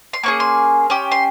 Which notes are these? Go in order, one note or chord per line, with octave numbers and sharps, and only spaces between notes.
C6
A#3 C#4 G#4 C#6
C6
C#4 G4
C6